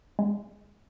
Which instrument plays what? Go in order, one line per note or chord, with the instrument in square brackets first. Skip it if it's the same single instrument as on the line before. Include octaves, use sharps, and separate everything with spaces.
[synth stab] G#3